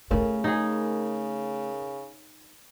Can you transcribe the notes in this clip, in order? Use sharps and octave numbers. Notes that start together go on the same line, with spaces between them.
C#3 A3 E4 A#4
D#4 G#4